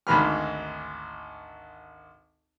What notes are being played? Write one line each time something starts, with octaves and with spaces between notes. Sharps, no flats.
G#1 D2 G#2 B4 F6